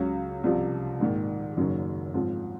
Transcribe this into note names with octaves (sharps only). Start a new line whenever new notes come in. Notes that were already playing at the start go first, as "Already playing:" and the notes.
Already playing: C#2 C#3 F#3
C2 C3 F3
A#1 G#2 D#3
F#1 F#2 D#3 F#3 C#4
G#2 F3 C4 F4